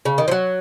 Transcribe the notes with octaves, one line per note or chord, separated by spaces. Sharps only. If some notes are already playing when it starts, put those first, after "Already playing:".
C#3
D#3
F3
F#3